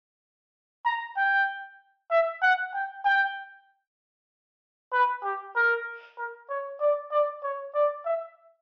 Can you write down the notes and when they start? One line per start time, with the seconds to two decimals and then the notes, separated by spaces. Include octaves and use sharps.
0.86 A#5
1.17 G5
2.11 E5
2.43 F#5
2.74 G5
3.05 G5
4.93 B4
5.23 G4
5.56 A#4
6.18 A#4
6.50 C#5
6.81 D5
7.12 D5
7.43 C#5
7.75 D5
8.05 E5